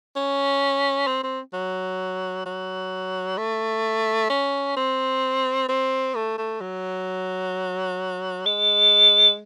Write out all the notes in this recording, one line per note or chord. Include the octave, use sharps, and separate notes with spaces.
C#4
C4
C4
F#3
F#3
A3
C#4
C4
C4
A3
A3
F#3
G#3